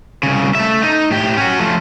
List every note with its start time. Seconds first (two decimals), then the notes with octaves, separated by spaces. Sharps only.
0.23 C2 C#3
0.55 A3 E5
0.82 D#4
1.10 A2 G4
1.37 C#4 F#4
1.59 F3 A3